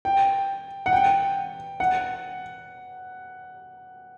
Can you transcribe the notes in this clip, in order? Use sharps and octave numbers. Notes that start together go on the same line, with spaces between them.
G5
F#5
G5
F#5